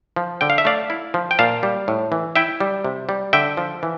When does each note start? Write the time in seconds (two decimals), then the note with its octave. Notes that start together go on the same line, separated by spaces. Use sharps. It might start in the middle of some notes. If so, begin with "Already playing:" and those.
0.16 F3
0.41 D3 G5
0.50 F5
0.58 E5
0.65 A3 D5 F5
0.90 E4
1.14 F3
1.31 G5
1.39 A#2 F5 A5
1.63 G3
1.88 A2
2.12 E3
2.36 E4 E5 G5
2.60 G3
2.84 C3
3.09 G3
3.33 D3 E5 G5
3.57 F3
3.83 E3